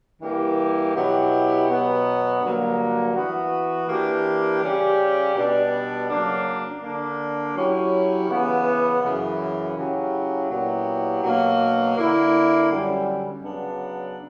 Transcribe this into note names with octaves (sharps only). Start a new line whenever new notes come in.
G2 E3 A#3 E4 G4
B2 F#3 B3 E4 G4
B2 F#3 B3
G2 D3 F#3 A#3
E3 B3 F#4
E3 A#3 D4 G4
C#3 G3 C#4 G4
B2 G3 B3 D4
C#3 F#3 A#3 D4
D3 A#3 D4
F#3 C#4 E4 G4
C#3 E3 B3
F#2 C#3 E3
C#3 F#3 C#4 E4 G4
A#2 F#3 B3 E4 G4
B2 F#3 A#3 D4
D3 A#3 E4
F#2 D3 G3 C#4
C#3 F#3 B3 D4